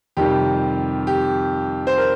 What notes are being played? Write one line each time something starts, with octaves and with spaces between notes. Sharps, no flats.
F2 C3 D#3 G3 G4
G4
C5
A#4